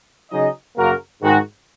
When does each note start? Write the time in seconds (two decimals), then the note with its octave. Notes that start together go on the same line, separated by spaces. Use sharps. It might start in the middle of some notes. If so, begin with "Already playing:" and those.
0.31 C#3 F#3 D#4 G#4 D#5
0.76 F#2 C#3 A#3 F#4 A#4
1.21 G#2 D#3 G#3 F#4